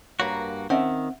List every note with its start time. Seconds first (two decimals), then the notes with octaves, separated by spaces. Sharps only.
0.20 G2 A#3 F#4 A#4 B4 C#5
0.70 D#3 C4 C#4 D#5 E5 F#5